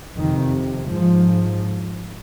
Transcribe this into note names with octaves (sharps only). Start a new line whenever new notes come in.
F2 C3 D#3
G#2 F3